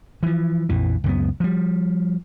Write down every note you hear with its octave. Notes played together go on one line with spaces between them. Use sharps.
E3 F3
A#1 F2 E3
C#2 F#2 B3
F3 G3